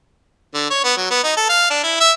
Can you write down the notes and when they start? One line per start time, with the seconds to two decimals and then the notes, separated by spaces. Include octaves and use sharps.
0.54 D3
0.70 C#5
0.84 B3
0.97 F#3
1.11 B3
1.24 D#4
1.37 A4
1.49 F5
1.70 D4
1.84 E4
2.00 E5